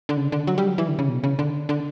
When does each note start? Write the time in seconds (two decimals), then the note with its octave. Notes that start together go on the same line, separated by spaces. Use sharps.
0.09 D3
0.17 C#3
0.32 D3
0.47 F#3
0.58 G3
0.68 F#3
0.78 E3
0.88 D3
0.99 C#3
1.09 B2
1.24 C#3
1.39 D3
1.69 D3